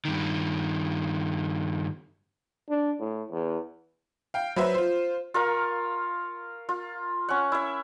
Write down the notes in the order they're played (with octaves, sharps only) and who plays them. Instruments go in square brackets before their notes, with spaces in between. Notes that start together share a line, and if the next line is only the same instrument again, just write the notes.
[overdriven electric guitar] G2 D#3
[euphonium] D4
A2
E2
[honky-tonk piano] F5 G5
F#3 B4 C5 E5
F4 C5
[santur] F4 A#4 F5 C#6
F4
C#4 F#5
E4 E5